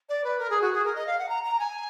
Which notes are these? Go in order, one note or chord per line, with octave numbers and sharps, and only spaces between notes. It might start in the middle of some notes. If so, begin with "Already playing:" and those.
D5
B4
A#4
G#4
F#4
G#4
A#4
D#5
F5
F#5
A#5
A#5
G#5